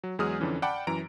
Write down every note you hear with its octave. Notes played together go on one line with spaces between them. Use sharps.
F#3
E2 F#3 G#3 G#4 D#6 F6
F2 D3 E3 C#4
D5 F#5 G5 A5 B5 D6
F#2 E3 A#5 D7